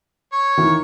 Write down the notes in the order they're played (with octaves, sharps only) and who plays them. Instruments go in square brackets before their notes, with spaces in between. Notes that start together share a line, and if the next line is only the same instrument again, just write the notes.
[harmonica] C#5
[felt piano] D#3 E3